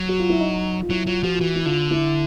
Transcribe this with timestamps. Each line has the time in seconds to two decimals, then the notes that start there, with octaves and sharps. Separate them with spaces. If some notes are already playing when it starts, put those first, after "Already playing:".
Already playing: F#3
0.09 F#4
0.19 F4
0.29 E4
0.40 D#4
0.82 F4
0.90 F#3 E4
1.06 F#3 F4
1.23 F3 F#4
1.34 F4
1.40 E3 F#4
1.55 E4
1.66 D3 F4
1.91 E4